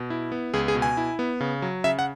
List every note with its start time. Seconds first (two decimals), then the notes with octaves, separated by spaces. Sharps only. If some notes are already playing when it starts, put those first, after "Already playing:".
Already playing: B2
0.10 E4
0.32 B3
0.54 C#2 G#4
0.68 G#4
0.75 B2
0.82 G#5
0.97 E4
1.19 B3
1.41 C#3
1.62 F#3
1.84 C#3 E5
1.99 F#5